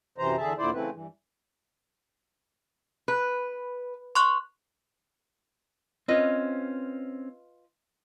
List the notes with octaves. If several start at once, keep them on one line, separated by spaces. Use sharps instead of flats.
F#2 C3 E3 C5 A#5
E2 D3 G#4 E5 A5
D#2 A#2 D3 E4 C5 D5
C#3 E3 A3 C4 E4 B4
G2 E3
B4
C6 C#6 F#6
C4 C#4 F4 B4 D#5